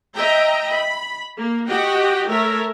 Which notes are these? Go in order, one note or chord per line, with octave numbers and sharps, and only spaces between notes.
D#5 E5 G5 A#5
B5
A#3
F#4 G4 D#5 F#5 G5
A3 A4 A#4 C#5 E5